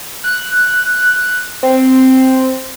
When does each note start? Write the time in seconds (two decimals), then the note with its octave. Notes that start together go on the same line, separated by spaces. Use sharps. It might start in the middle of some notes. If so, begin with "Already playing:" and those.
0.24 F#6
1.63 C4